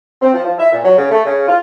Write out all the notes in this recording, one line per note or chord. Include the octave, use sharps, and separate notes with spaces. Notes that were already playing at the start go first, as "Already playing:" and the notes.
C4
F3
F3
E5
A#2
F#3
C#3
A3
C#3
F4